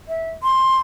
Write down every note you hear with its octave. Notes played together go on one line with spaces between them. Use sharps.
E5
C6